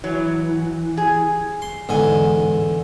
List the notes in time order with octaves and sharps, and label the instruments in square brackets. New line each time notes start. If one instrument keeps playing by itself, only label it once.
[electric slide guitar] E3 [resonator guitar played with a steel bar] F#3
[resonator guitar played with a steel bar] G#4
[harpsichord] C6
[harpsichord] E2 D3 G#5 [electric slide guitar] G#2